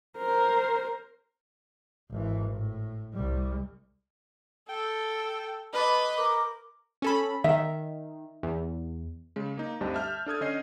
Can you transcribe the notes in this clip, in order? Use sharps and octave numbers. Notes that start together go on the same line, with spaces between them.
A#4 C5
G#1 E3
A2
C2 G3
A4 G5
B4 D#5 A5 D6
A#4 D6
C#4 A4 B5
D#3 E5
E2
C#3 G#3
A#3 D#4
D2 G2 G3 C4 D#5 A5
E5 A5 F6 G6
D4 A4 D#6 G#6
D3 C#4 C#5 D#5 C7